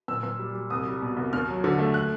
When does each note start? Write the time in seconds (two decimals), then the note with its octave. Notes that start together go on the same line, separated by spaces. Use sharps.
0.08 A#2 E6
0.23 A#2
0.39 G3
0.55 G3
0.70 C2 D#6
0.86 G3
1.02 B2
1.16 C2
1.33 D#2 F6
1.47 F#3
1.64 D3
1.79 A3
1.94 F#6